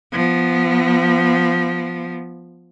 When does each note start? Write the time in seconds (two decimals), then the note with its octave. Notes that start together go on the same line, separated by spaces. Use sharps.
0.12 F3 B3